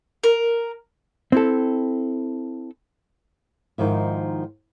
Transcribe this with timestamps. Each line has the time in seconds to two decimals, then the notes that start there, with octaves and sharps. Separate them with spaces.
0.24 A#4
1.32 C4 E4 A4
3.78 G#2 D#3 F3 E4